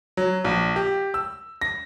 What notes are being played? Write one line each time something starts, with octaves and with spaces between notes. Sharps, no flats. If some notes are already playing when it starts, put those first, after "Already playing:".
F#3
A#1
G4
E6
A#6